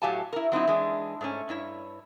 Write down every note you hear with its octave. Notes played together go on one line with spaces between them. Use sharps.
A2 F#3 G4 F5 G#5 A5
E4 A#4
F#3 C4 D#4 E4
E3 G#3 D4
G#2 A3 C#4
G2 E4 C#5